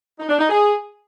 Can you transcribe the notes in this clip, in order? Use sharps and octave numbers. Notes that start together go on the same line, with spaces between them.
D#4
D4
D#4
G#4